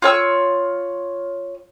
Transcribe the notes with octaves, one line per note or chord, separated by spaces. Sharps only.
F4 C#5 E6